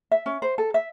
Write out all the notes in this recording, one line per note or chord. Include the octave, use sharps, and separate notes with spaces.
E5
C#4
C5
A4
E5